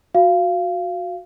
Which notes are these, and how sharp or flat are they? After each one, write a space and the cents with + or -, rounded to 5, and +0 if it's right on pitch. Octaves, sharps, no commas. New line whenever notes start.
F#4 -15 F5 -20